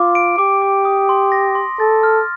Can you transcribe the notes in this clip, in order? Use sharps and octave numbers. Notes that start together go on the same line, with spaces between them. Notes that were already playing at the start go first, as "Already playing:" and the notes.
Already playing: F4 D6
D7
G4 D6
D6
D#6
C6
A#6
C6
A4 A6
F6